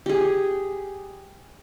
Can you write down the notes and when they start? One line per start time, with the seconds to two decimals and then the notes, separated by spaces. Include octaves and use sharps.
0.06 G4 G#4